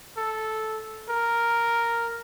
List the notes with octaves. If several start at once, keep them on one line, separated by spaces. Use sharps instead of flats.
A4
A#4